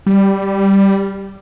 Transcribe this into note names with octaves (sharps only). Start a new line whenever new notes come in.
G3